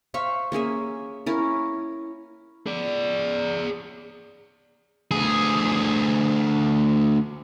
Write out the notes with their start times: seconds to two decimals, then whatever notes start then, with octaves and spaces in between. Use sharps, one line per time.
0.14 C5 E5 F5 C#6
0.52 A#3 C#4 G#4 E5
1.26 C#4 E4 A#4
2.67 G#4 D5
5.11 D2 G#4